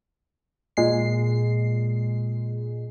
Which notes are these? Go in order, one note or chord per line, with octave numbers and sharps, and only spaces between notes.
A#2 G#3 C7